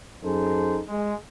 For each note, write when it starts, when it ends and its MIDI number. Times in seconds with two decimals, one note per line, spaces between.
0.23 0.80 42
0.23 0.80 63
0.23 0.80 68
0.23 0.80 69
0.23 0.80 72
0.88 1.15 56